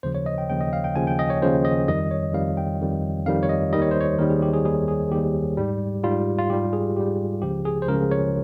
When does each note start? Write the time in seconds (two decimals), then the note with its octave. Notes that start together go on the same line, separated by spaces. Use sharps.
0.03 D#2 C#3 F3 C5
0.15 C#5
0.26 D#5
0.38 G5
0.50 D#2 C#3 F3 G5
0.61 D#5
0.73 F5
0.84 G5
0.95 D#2 C#3 F3 G#5
1.07 G5
1.19 D#5
1.30 C#5
1.42 D#2 C#3 F3 C5
1.65 D#5
1.88 F2 D#3 G3 D#5
2.11 C#5
2.34 F2 D#3 G3 F5
2.57 G5
2.80 F2 D#3 G3
3.26 F2 D#3 G3 F5
3.43 C#5
3.49 D#5
3.73 D#2 D#3 G3 D#5
3.82 C#5
3.91 C5
4.00 C#5
4.19 D#2 D#3 G3 A#4
4.30 G#4
4.42 G4
4.53 G#4
4.65 D#2 D#3 G3 G#4
4.88 G#4
5.11 D#2 D#3 G3 G4
5.57 G#2 G3
6.04 G#2 G3 F4
6.39 F4
6.50 G#2 G3 G4
6.73 G#4
6.96 G#2 G3 G4
7.42 C#2 C#3 F3 G4
7.65 G#4
7.82 C5
7.88 C#2 C#3 F3 A#4
8.11 C#5